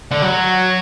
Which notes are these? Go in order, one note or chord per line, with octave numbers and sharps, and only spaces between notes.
D3
F#3